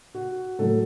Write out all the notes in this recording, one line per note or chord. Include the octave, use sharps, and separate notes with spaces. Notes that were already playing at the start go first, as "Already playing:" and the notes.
F#4
A2 F#3 A4